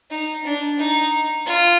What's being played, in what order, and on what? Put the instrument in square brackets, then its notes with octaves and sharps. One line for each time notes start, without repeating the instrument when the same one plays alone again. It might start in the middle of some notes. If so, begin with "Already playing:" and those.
[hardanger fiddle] D#4
D4
D#4
F4